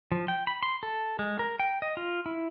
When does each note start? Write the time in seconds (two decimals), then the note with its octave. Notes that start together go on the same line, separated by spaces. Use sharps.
0.12 F3
0.28 G5
0.47 B5
0.63 C6
0.83 A4
1.19 G#3
1.39 A#4
1.60 G5
1.82 D#5
1.97 F4
2.26 E4